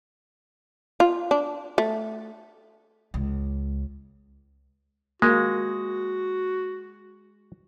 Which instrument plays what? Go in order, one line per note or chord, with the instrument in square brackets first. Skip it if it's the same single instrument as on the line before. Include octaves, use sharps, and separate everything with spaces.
[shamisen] F4
D4
A3
[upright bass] C#2
[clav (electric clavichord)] G#3 [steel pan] A#3 [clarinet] F#4